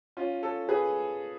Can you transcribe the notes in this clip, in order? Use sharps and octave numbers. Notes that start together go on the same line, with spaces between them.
C#4 F4
A4 C#5
G#4 B4